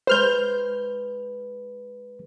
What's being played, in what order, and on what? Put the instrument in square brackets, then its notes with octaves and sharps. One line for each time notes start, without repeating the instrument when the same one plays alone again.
[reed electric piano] G#3 G#4 B4 [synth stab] C5 F6 G6